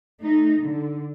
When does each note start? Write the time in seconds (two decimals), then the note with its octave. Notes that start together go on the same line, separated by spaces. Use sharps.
0.21 A3 D#4
0.61 D3